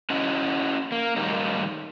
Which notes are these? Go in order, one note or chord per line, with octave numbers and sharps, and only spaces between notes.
C#4 E4 F#4 D#5
A#3
A2 D#3 F#3 G3 A#3 D#4